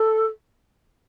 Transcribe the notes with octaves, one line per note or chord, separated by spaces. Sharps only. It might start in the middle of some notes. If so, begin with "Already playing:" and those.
Already playing: A4